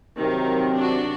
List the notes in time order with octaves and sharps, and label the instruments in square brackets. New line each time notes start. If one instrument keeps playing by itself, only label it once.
[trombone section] C3 F#3 C4 [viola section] D#3 A#4
[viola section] D4 F#4